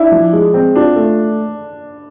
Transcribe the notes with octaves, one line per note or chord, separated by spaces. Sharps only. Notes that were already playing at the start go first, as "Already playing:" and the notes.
Already playing: D4 E4
F3
G#3
C4
D4 F4
A3